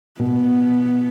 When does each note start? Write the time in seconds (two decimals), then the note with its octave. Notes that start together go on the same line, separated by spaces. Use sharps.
0.20 B2 B3